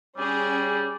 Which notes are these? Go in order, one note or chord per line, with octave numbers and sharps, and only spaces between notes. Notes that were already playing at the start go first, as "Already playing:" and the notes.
G3 C#4 G#4